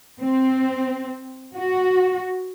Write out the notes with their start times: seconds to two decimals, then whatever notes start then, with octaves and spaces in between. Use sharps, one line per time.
0.20 C4
1.54 F#4